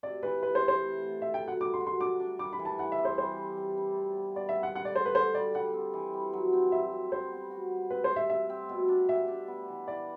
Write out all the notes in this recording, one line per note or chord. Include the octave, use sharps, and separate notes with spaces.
C3 D5
E3 B4
C3 B4
C5
E3
C5
A3
D3
D3 E5
G5
F#3
F#5
G3 D6
C6
F#4
C6
D4 D6
D4
G3 D6
B5
E3
A5
E3 F#5
E5
C4
C5
G3 C5
G3
G3
D4
C3
B3
B3 D5
E5
C3
F#5
D3 F#5
D5
D3 C5
B4
D3 C5
G3 D5
G3 F#5
C4
E3
G3
F#3
C4
F#3 E5
C4
G3 C5
B3
F#4
G3
C4 B4
C5
C3
E5
C3 E5
C4
B2
D4
G4 E5
D4
B3
E3
E3 D5